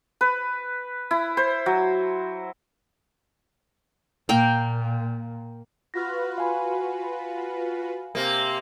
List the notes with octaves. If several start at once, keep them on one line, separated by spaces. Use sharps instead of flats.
B4
E4
C5
F#3
A#2 A#3 G5
F4 F#4 B4 F6 A#6
F5 G#5 B5
C3 A#3